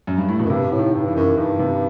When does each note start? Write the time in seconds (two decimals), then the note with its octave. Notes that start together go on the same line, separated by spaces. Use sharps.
0.07 F#2
0.18 G2
0.29 A2
0.39 B2
0.45 F#2
0.50 G2 C3
0.72 A2
0.79 D#3
0.94 G2
1.08 E3
1.15 F#2
1.37 G2 D#3
1.59 C3